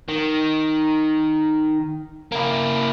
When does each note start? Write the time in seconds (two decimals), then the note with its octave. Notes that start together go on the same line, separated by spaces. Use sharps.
0.08 D#3
2.32 A#3 E4